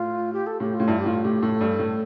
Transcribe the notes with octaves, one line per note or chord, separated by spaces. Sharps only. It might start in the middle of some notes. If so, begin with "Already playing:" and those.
Already playing: A2 F4
G4
A4
A2 G4
F4
A2
G2 E4
G4
A2 F4
A2 G4
A2 A4
G2
A2